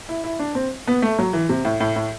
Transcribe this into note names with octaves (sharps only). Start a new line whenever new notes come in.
E4
E4
D4
C4
B3
A3
F#3
E3
C3
A2
A2
A2